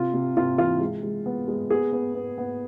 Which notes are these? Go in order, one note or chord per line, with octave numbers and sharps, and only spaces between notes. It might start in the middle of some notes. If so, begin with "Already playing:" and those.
Already playing: C3 F4
C3
C3 F4
E3 F4
G#3
G#3
B3
G#3
B3 G#4
B3
B3
B3